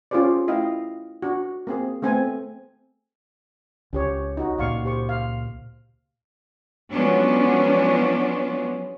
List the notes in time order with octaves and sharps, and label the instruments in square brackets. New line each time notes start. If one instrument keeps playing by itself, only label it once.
[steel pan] C#4 F4 G4 G#4 C5 D5
A3 E4 D#5 F5 G5
D4 F#4
A#3 C4 G#4
A3 B3 C4 A4 G#5
[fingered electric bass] C#2 [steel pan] C#4 G4 C#5
[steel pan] D#4 F#4
[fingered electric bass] C#2 A#2 [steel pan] D5 F5 C#6
[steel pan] G4 C5 C#6
F5
[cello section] F3 F#3 G#3 B3 C#4 D4